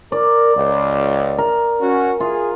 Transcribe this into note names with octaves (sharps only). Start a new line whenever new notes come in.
A#4 D5
C#2
A#4
C#4 F#4
F4 G#4